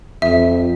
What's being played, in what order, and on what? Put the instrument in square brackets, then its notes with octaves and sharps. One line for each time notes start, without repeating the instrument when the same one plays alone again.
[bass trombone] F2 [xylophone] E5